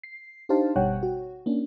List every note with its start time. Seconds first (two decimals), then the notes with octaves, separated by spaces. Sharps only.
0.04 C7
0.49 D4 D#4 G4 C5 F5 A5
0.76 G1 B2 G3 C#5 F#5 G5
1.03 F#4
1.46 A#3 C#4 D4